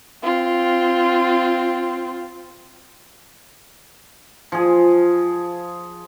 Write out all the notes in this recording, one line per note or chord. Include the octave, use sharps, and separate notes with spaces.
C4 F4
F3 G#4